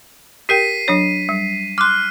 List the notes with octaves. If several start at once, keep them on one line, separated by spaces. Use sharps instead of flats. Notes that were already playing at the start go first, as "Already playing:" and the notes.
G4 A#4 G5 B6 C7 D#7
F#3 D4 C#5
G3
C6 D6 F6 F#6